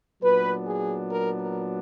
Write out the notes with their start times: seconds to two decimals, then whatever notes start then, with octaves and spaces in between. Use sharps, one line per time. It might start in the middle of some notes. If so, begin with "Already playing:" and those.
0.22 A#2 F#3 B3 D4 B4
0.66 G#4
1.10 A#4
1.40 A#4